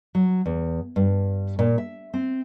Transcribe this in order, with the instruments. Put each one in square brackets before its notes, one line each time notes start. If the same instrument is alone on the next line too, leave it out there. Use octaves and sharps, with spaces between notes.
[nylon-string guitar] F#3
E2
G2
A#2
E5
C4